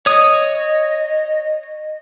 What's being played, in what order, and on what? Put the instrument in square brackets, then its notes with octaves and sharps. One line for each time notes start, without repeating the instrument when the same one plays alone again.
[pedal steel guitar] C#5 D#6 [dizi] D#5